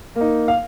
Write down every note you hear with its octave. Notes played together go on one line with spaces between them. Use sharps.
A#3
D#4
F5